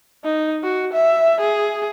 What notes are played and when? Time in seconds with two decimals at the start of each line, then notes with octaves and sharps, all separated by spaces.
0.24 D#4
0.63 F#4
0.93 E5
1.40 G#4